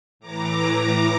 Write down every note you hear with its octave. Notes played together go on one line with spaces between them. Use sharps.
A2 E3 A#5 D6
A#5 D6